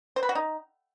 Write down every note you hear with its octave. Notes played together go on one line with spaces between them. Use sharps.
C5
B4
F#4
D#4